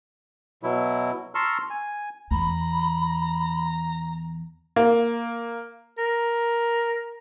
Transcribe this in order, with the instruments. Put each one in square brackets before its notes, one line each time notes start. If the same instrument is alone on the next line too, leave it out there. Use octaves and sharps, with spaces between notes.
[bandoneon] B2 F#3 E4
A5 A#5 C6 C#6 E6 F6
G#5
[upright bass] E2 [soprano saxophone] A#5 [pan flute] B5
[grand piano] A#3
[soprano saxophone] A#4